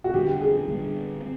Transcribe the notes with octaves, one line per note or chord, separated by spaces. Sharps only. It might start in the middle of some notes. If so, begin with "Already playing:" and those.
F#4
D3 G3 B3 D4 G4
G#4
D3 G3 B3 D4
C4